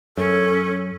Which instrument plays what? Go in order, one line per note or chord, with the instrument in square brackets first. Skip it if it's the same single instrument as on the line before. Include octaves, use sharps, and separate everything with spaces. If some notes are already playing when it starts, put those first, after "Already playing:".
[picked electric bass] F#2 [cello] C#4 [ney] A4